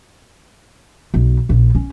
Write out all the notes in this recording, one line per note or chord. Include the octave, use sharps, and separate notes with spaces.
B1
A#1
C#4